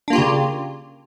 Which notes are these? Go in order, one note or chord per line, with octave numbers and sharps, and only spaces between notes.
C#3 A#3 D4 F4 G4